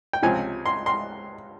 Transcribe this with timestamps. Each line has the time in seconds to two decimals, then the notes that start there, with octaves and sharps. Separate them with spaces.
0.13 G5
0.22 C#2 C3 F3 C4 G#5
0.66 C6
0.86 C6